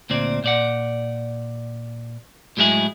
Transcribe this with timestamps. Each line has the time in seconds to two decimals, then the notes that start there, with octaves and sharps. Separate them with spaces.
0.10 D2 A#2 C4 D5
0.44 A#2 D5 F#5
2.57 A2 F#3 G#3 E4 G#4